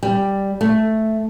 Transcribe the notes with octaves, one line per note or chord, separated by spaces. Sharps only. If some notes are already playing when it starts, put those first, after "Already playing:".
G3
A3